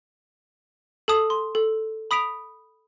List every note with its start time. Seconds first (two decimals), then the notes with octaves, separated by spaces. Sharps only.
1.08 A4 A5 D#6
1.30 C6
1.55 A4
2.11 B5 D#6 B6 D7 F7